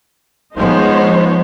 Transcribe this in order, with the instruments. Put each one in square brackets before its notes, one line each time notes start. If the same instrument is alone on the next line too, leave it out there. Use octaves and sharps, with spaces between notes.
[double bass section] F3 G#3 B3 [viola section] D#4 C5 C#5